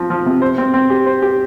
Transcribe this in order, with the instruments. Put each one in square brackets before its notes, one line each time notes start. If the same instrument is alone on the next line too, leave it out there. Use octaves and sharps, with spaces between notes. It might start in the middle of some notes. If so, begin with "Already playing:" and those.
Already playing: [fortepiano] F3 C4
F3
C3
C5
C4
C4
G4
C5
G4